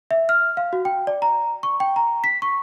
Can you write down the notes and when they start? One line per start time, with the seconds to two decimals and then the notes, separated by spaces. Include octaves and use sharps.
0.11 E5
0.29 F6
0.57 F5
0.73 F#4
0.85 G5
1.07 D5
1.22 A#5
1.63 C#6
1.80 G5
1.96 A#5
2.24 B6
2.42 C#6